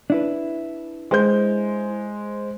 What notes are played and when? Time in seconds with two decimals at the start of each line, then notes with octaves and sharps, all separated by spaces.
0.10 D4 E4 B4
1.11 G#3 C5 G6